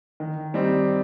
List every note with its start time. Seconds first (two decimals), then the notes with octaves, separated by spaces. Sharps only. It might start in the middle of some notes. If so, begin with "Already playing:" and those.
0.20 D#3
0.54 G3 C4 D#4